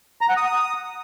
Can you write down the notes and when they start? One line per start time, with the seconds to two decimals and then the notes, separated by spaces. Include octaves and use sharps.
0.21 A#5
0.29 F#5
0.37 D#6